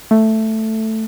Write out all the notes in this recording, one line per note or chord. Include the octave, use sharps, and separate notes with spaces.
A3